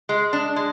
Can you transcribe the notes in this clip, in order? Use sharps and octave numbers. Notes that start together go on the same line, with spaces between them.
G#3
D4
G#3